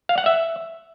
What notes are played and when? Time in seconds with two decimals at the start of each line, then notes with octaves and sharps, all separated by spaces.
0.09 F5
0.18 F#5
0.26 E5